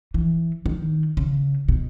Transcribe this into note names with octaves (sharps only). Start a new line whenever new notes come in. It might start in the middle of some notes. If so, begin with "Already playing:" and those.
E3
D#3
C#3
B2